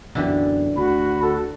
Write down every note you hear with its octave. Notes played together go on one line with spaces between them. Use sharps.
B1 F#2 D3 E3 G4
D2 F#4 B5
A4